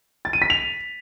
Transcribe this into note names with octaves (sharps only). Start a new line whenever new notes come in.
A6
D#7
B6
F7